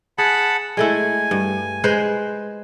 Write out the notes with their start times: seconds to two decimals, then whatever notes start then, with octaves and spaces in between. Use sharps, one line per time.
0.18 G#4 F#5 A5 B5
0.77 G#3 A3 E4 G#5
1.31 G2
1.84 G#3 B4 C5